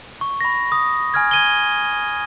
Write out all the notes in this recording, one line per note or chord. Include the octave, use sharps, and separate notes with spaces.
C#6
B5 A#6
D#6
G#5 F6 G#6
G#6 D#7 G7